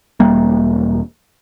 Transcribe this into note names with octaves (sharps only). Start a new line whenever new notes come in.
E1 G3 A#3